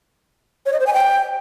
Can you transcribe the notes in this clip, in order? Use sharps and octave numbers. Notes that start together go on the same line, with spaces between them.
C#5
D#5
C5
G#5
G5